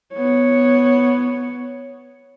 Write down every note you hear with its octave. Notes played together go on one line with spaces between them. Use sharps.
B3 C#5